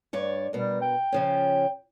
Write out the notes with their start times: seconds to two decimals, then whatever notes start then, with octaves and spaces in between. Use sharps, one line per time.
0.13 G2 C#5 D5
0.53 B2 G3 A#4
0.82 G5
1.12 C#3 F3 C#4